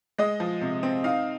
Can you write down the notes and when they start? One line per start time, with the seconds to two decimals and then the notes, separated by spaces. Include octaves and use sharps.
0.18 G#3 D#5
0.40 F3
0.61 C3
0.83 C4
1.04 D#4 F5